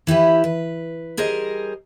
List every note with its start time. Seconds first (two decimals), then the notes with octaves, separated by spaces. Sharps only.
0.07 E3 E4 G4 B4
0.44 B4
1.17 G3 G#4 A#4 C5 D#5